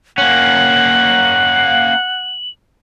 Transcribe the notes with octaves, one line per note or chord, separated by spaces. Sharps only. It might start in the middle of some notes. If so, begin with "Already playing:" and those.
A#3 C#4 F#5 F#7